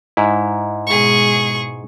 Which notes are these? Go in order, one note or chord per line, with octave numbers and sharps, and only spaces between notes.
G#2 E4
B2 G#3 G#4 C#6